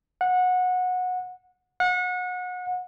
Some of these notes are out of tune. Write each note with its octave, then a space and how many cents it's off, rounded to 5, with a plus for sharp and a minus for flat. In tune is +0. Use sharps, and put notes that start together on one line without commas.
F#5 -20
F#5 -30